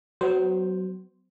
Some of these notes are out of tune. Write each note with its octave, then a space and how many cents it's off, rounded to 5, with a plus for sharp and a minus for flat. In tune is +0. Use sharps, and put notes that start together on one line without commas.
F#3 +10 B3 +35 C5 +0